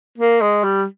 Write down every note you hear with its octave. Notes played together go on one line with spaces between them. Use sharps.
A#3
G#3
G3